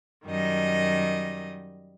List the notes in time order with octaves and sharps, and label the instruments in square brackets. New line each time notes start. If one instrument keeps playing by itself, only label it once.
[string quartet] F#2 D#3 G3 D#5